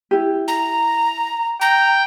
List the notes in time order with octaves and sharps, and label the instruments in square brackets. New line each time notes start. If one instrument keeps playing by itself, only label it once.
[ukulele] E4 G4
[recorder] A#5
[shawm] G5 [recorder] A#5